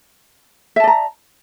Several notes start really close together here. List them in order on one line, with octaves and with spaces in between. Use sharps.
E5 A5 D5 A#5